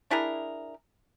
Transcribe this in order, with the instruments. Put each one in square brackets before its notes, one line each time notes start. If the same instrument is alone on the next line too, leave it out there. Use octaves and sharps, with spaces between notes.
[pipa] D4 E4 G#4 A#4